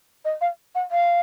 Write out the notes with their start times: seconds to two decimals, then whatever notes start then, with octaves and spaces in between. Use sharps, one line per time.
0.25 D#5
0.41 F5
0.75 F#5
0.91 F5